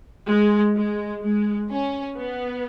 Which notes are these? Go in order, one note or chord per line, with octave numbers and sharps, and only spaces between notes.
G#3
G#3
G#3
C#4
B3